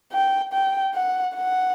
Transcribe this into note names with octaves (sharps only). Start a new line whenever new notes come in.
G5
G5
F#5
F#5